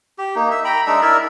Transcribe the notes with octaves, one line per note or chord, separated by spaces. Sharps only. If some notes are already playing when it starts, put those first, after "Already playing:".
G4
A#3 D#4
E5
G5 A#5 B5
G#3 D4 D#4 E5
E4 A#4 D5 E5